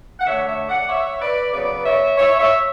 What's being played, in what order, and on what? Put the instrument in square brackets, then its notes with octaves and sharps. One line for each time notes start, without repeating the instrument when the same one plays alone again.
[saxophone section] F#5
D3 A3 C#5 E5
C#5 E5
D5 F#5
C#5 E5
B4 D5
C#3 F#3 B3 B4 D5
C#5 E5
C#5 E5
C#5 E5